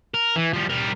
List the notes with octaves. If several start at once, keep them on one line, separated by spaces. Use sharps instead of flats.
A#4
E3
F3 G3
G3 A#4